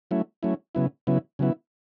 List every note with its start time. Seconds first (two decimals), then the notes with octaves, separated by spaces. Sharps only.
0.11 F#3 A3 C#4 E4
0.43 F#3 A3 C#4 E4
0.75 C#3 F#3 B3 E4
1.07 C#3 F#3 B3 E4
1.39 C#3 F#3 B3 E4